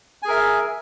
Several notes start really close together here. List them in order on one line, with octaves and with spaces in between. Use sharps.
G#5 G#4 A#4 E5